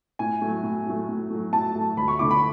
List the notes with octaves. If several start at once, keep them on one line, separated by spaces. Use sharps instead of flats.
A2 G#5
F#3 A3
A2
F#3 A3
A2
F#3 A3
A2 A5
F#3 A3
D2 B5
C#6
D3 A3 E4 D6
B5